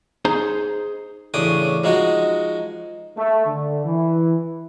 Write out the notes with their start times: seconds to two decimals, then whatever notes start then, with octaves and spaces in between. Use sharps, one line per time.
0.25 D#4 G#4 C5 A#5
1.34 A1 C#3 D4 G5 D#6
1.84 F3 G#3 D#4 F#4
3.17 A3
3.46 D3
3.84 E3